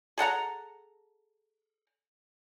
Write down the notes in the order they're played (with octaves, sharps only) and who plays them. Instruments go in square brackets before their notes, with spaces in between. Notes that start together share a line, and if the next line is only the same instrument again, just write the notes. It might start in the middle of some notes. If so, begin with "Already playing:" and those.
[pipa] G#4 A4 F#5 A#5